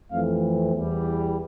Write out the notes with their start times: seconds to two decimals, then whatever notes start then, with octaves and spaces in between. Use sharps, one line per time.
0.11 F2 E3 A3 C4 F5
0.75 E2 E3 G3